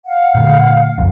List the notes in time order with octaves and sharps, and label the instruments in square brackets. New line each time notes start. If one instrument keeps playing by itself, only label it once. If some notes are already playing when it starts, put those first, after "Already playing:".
[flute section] F5 F#5
[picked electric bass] A#2 D3 A3
F#1 C2 F#2